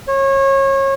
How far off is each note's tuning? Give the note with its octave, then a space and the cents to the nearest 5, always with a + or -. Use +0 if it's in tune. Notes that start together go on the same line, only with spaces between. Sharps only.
C#5 -30